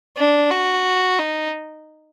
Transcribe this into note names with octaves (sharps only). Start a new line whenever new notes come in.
D4
F#4
D#4